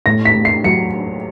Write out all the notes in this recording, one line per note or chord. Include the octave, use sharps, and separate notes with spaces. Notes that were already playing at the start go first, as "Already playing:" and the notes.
A2 A#6
B6
A2
C7
F#3 C#7